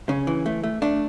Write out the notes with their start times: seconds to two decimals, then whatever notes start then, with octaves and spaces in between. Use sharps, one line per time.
0.09 C#3 C#4
0.27 E3
0.46 A3
0.64 A3
0.82 A3 D4